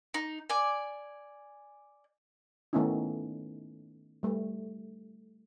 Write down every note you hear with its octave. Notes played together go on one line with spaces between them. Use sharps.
D#4
D5 G#5
D#3 A3 B3 C#4 D#4 E4
G3 A3